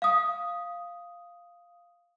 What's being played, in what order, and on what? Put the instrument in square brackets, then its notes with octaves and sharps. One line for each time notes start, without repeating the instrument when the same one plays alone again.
[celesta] F5 D#6